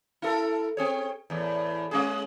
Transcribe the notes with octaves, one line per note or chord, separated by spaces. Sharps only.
E4 A4 A#4
C4 G#4 C#5
E2 A2
G#3 C#4 G#4